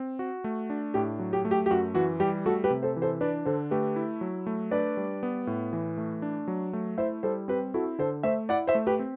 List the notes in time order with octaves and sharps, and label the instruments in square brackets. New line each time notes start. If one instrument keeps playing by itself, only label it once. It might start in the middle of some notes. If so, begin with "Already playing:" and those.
Already playing: [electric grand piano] C4
F#4
A3
D4
[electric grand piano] A2 [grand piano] G4
[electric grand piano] F#3
[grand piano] G4
[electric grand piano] A3
[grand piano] G4
G4
[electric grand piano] F#2 [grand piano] F#4
[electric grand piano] E3 [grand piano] F#4
[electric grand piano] G3 [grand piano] G4
[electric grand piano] A3 [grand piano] F#4 A4
[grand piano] G4 B4
[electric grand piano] C3
[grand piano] A4 C5
[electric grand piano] E3
[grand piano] A4 C5
[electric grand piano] D4 [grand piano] B4 D5
[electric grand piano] D3 [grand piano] A4 C5
[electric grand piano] A3 [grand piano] G4 B4
[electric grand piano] E4
F#3
A3
[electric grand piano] D4 [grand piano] B4 D5
[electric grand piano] G3
B3
A2
E3
A3
D4
F#3
A3
[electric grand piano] E4 [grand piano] C5 E5
[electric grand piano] G3 [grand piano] A4 C5
[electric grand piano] C4 [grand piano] G4 B4
[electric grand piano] E4 [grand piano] F#4 A4
[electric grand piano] D3 [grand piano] A4 C5
[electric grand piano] A3 [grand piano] C5 E5
[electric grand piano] E4 [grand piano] D5 F#5
[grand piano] C5 E5
[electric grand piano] A3
[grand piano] G4 B4
[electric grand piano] C4